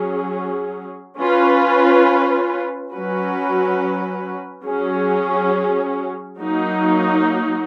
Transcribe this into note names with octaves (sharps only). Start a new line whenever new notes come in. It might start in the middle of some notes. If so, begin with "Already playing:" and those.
Already playing: F#3 C#4 G#4
C#4 F4 B4
F#3 C#4 F#4 B4
F#3 C#4 G#4
F#3 A#3 D#4